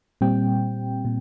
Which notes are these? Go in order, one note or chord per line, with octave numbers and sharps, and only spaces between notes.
A#2 G3 C4 G5
A#2